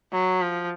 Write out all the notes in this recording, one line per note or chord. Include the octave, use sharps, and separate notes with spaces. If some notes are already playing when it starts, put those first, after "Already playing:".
F#3
F3